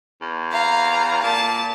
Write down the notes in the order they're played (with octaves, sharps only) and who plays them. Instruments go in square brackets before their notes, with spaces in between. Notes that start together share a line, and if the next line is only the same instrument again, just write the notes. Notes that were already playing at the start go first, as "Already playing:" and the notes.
[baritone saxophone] E2
[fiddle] F5 A#5
[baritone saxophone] A#2 [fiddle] A5